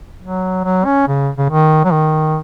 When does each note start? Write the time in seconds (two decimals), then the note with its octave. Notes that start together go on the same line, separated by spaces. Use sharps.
0.22 F#3
0.64 F#3
0.85 C#4
1.07 C#3
1.38 C#3
1.50 D#3
1.85 F#3
1.92 D#3